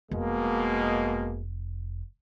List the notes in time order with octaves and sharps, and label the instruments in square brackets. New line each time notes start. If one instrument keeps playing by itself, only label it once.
[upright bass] F1 [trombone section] B2 G#3 A#3